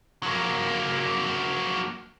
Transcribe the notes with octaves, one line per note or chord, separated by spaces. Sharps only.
F#3 A#3